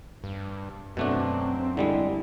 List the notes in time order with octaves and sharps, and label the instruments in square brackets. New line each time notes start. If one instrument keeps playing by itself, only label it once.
[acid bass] G2
[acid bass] F#2 [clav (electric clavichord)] B2 A3 D4 [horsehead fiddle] C4
[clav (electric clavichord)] D3 G3 G#3 [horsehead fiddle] E4